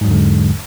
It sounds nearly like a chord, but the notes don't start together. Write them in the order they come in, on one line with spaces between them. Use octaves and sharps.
G#2 F#3 E2 D3 G#3